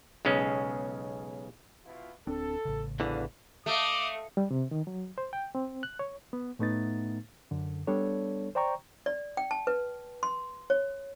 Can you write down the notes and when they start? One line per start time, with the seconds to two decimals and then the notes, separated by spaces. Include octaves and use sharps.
0.25 B1 C#3 G#3 C#4
1.85 B2 E4 F4
2.27 D1 C4 D4 A4
2.65 A1 C#3
3.00 E2 D3 E3 F3 F#4 F5
3.66 A3 D#5 F5 D6
4.37 G3
4.51 C3
4.71 D#3
4.87 F#3
5.18 C5
5.33 G5
5.55 C4
5.83 F#6
5.99 C#5
6.33 B3
6.59 A2 A3 B3 D#4 A6
7.51 F#2 D3
7.87 G3 B3 D4 A4 C#5
8.55 C5 D5 G5 A#5 C#6
9.06 D5
9.37 G5
9.51 A5
9.67 B4
10.23 C6
10.70 C#5